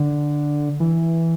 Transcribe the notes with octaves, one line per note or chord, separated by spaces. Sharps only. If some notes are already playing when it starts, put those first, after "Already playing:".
Already playing: D3
E3